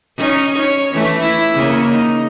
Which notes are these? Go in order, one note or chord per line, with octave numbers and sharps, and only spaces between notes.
C#4 D#4
C#5
E3 A3
E4
C#3 A#3
D#4